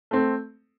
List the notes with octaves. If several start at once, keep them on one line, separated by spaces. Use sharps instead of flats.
A3 C4